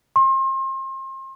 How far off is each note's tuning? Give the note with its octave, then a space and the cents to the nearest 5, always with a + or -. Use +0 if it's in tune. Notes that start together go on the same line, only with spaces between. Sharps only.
C6 +35